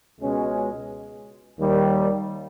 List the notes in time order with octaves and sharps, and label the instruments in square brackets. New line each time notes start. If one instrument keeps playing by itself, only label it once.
[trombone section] C#2 B2 G#3 C#4
D#2 D#3 G3